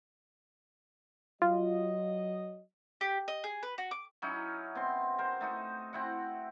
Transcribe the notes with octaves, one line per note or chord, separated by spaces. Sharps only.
F#3 F4 D#5
G4
D#5
G#4
B4
F#4
D6
F#3 C#4 D#4 E4
B2 C4 C6
A#4 C5
A3 D#4 F#4
C4 E4 F#5